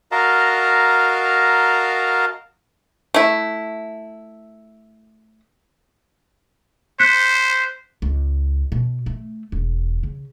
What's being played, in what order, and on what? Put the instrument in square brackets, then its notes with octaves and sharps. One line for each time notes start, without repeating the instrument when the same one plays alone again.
[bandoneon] F#4 A#4 D#5 F5 A5 A#5
[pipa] A3 E4
[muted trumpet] C5 [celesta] F#6 B6 C#7
[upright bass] C#2
B2
A3
E1
C#3